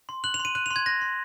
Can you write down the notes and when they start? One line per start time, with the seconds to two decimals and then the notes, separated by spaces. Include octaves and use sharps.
0.09 C6
0.24 F#6 F#7
0.34 F7
0.40 C6
0.45 D#7
0.55 F#6 D#7
0.66 F7
0.71 C6
0.76 G#6
0.86 F#6 A#6
1.01 C6